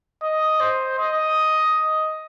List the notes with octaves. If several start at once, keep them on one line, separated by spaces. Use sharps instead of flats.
D#5
C5
D#5